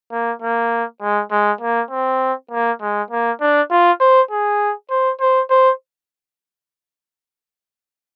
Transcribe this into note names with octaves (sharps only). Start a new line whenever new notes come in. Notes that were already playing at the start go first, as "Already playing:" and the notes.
A#3
A#3
G#3
G#3
A#3
C4
A#3
G#3
A#3
D4
F4
C5
G#4
C5
C5
C5